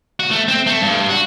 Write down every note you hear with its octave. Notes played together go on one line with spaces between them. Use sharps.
F#4
A3
C4
A3
G2
F#4